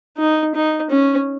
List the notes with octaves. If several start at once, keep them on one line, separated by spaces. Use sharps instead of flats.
D#4
D#4
C#4